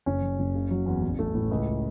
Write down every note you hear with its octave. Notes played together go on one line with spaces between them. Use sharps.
F#1 C#4
F#2
F#1
C#3
F#3
E2
A1
A3
A2
C#2